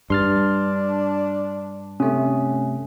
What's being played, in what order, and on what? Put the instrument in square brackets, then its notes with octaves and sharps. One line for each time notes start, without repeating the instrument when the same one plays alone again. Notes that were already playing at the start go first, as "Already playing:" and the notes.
[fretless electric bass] G2 [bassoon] D4 [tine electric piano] C6 F6 A6
[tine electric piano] C3 A3 [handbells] C#4